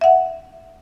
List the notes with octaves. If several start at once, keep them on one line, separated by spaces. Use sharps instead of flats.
E5 F#5